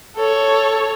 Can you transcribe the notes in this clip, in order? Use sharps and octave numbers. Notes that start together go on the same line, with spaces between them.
A4 C#5